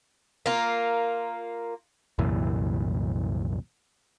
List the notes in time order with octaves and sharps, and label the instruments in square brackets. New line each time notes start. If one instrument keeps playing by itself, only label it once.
[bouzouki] A#3 F4
[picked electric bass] C2 F#2 A#2 E3